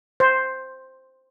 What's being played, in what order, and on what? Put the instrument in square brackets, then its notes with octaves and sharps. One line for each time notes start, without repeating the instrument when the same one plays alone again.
[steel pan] C5